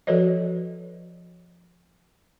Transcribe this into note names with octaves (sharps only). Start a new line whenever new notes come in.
F3 F#4 A4 B4 C#5 D#5